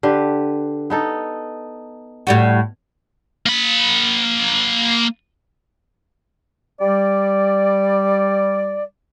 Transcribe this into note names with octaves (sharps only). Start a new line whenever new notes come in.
D3 G4 B4
B3 D#4 A4
A2 G3 F#4
A#3 B5
G3 D5